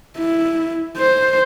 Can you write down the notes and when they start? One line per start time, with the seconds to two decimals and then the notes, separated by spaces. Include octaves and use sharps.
0.18 E4
0.97 C5